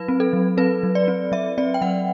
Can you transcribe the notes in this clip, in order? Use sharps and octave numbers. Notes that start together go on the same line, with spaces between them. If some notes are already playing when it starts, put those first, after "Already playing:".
Already playing: F#3 B4
C4
A4
F#3
C4 B4
F#3
D5
C4
F#3 E5
C4 D5
G5
F#3 F#5